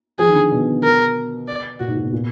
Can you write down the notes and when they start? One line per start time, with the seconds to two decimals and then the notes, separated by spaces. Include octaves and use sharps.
0.19 F3 G#4
0.27 D#3
0.35 D3
0.52 B2
0.84 A#4
1.48 D5
1.80 A#2 F#4
1.88 G#2
1.96 A#2
2.05 B2
2.13 A#2